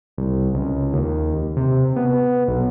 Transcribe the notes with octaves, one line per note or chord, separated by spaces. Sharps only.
C2
C#2
D#2
C3
B3
B1